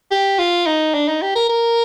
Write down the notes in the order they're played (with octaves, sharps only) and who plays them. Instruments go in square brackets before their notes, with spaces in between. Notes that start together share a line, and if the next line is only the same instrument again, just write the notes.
[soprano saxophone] G4
F4
D#4
D4
D#4
G4
A#4
A#4